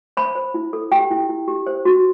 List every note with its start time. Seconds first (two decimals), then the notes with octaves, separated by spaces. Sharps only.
0.17 C5 B5
0.35 C5
0.54 E4
0.73 A4
0.92 G4 G5
1.11 E4
1.29 E4
1.48 G4
1.67 C5
1.85 F#4